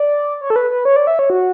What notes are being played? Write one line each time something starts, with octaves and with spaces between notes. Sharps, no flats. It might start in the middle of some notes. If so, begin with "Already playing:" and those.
Already playing: D5
C#5
A4
B4
B4
C#5
D5
E5
C#5
F#4